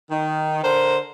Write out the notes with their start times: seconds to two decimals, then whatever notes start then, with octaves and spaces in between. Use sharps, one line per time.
0.10 D#3
0.63 D3 A#4 C5